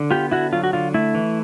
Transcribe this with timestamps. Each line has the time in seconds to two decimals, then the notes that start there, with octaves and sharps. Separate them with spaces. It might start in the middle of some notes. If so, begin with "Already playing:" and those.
Already playing: D3
0.11 B3 F4 G4
0.31 D3 E4 F#4
0.53 F#3 F4
0.64 F#4
0.73 D3 F4
0.94 A3 E4
1.15 E3